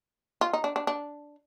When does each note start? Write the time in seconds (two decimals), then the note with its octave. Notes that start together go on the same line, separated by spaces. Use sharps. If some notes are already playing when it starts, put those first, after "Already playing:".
0.41 F4
0.53 D#4
0.64 D4
0.76 D4
0.87 D4